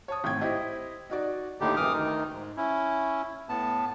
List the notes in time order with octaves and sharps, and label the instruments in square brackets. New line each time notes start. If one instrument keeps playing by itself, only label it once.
[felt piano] C#5 A5 D#6
G#1 A2 G5 G#6
E4 G4 C5 D#5
D#4 F#4 D5
[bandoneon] D#2 A2 D3 D#4 G4
F#2 E3 D6 D#6 F6
D2 D#3 D#4
G#2
C#4 E4
A2 B3 A5